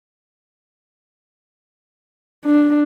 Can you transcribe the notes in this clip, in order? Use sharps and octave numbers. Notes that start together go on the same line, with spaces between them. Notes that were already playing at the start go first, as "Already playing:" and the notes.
D4